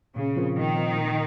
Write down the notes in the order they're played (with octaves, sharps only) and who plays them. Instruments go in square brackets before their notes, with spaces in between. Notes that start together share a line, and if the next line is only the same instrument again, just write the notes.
[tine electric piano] A#2 [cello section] C#3
[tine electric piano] F3 C4 F4 A#4
[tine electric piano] A#2 [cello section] D#3
[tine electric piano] F3 C4 F4 A#4
A#2